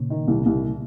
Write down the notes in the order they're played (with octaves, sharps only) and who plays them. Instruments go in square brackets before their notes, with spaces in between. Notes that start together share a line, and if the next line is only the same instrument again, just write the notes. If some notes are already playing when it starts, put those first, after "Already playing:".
Already playing: [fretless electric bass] A#2 C#3
[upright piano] D#3
C2
C2